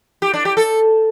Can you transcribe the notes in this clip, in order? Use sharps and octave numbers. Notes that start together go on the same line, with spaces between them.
G4
D4
G4
A4